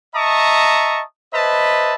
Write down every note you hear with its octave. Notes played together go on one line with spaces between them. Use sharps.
D#5 E5 A5 A#5 C#6 D#6
B4 C5 D#5 E5 A5 B5